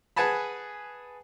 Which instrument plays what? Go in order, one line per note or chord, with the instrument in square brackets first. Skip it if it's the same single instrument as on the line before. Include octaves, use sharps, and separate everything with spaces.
[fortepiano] G#4 B4 F#5 G#5 A5 B5